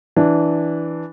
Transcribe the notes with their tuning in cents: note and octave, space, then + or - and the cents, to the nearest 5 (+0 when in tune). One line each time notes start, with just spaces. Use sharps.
E3 +0 D4 +0